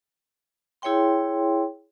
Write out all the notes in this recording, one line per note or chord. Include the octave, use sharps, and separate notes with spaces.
E4 G#4 C#5 E5 G5 C6